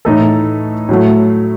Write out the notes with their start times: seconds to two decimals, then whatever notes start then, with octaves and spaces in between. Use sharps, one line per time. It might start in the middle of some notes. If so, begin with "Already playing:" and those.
0.05 A2 E3 A3 D#4 A4
0.89 A2 F#3 A3